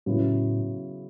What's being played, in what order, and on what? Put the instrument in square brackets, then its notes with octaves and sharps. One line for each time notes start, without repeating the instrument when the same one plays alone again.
[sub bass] A2 [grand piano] C#3 F#3 B3 E4